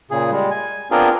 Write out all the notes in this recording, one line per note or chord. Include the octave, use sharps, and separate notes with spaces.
A#2 C#3 G#4
G3 G#3
G#5
B3 C4 D4 F4 G#4 A#4